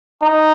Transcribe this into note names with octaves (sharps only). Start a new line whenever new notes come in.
D#4